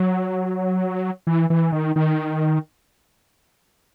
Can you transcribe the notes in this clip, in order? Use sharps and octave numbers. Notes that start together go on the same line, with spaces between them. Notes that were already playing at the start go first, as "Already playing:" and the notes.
Already playing: F#3
E3
E3
D#3
D#3